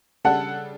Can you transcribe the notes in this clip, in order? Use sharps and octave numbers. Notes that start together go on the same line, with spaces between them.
C#3 G3 D4 A4 F#5 A5